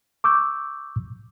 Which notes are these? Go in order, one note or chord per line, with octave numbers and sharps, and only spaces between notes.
C#6 D6 E6 G6